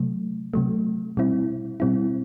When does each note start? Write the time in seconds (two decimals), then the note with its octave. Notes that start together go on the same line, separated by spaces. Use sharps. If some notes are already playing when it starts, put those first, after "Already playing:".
Already playing: C3 F#3 A3
0.54 C3 F#3 A3
1.17 B2 G3 C4 E4
1.80 B2 G3 C4 E4